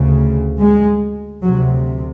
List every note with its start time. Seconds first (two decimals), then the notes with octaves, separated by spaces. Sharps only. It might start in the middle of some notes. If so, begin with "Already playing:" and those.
Already playing: D2 C#3
0.61 G#3
1.43 D2 C3 F#3